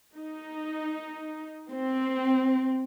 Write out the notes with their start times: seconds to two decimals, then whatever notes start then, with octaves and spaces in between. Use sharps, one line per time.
0.16 D#4
1.71 C4